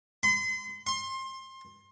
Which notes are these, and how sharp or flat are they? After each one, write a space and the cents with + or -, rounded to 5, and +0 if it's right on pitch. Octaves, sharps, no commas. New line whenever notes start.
C6 -40
C6 +25